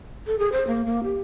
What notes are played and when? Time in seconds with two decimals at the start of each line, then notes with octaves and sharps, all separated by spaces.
0.27 A4
0.39 G#4
0.52 C5
0.67 A#3
0.86 A#3
1.04 G4